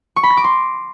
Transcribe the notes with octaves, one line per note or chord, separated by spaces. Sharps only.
C#6
B5
A#6
D6
C6